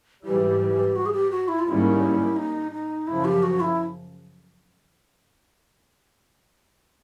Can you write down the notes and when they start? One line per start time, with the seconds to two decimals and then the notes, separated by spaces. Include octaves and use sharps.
0.25 G#2 E3 G3 G4
0.96 F#4
1.06 G#4
1.13 G4
1.31 F#4
1.48 E4
1.59 F4
1.66 G#2 D#3 G3 A#3 C#4 E4
2.36 D#4
2.72 D#4
3.07 F#2 C#3 F3 E4
3.25 G4
3.43 F#4
3.60 E4